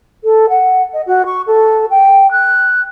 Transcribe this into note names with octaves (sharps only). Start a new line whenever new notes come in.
A4
F#5
D#5
F#4
C#6
A4
G5
F#6